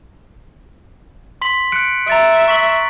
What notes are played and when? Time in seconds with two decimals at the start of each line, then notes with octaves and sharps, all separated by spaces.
1.42 C6 B6 F#7
1.72 F#6 C#7 D7
2.08 E5 A#5 A6 D7
2.48 C#6 B6 F#7